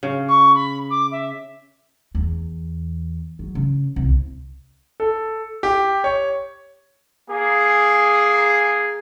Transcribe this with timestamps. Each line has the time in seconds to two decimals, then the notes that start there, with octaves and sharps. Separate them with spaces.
0.03 C#3
0.28 C#6
0.55 B5
0.90 D6
1.11 E5
2.15 E2
3.39 F#3
3.55 C#3
3.96 C2
5.00 A4
5.63 G4
6.04 C#5
7.30 A#3 G#4